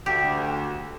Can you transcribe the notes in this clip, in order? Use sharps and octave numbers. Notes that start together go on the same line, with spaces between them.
D2 G4